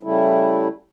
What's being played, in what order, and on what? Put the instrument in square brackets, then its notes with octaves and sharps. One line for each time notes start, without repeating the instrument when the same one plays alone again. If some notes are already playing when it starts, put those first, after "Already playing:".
[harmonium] C#3 G3 A3 E4